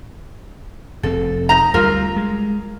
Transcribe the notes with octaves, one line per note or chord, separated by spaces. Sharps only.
F1 C4 A4
D#4 A#5
D2 G3 F4 A#4
G#3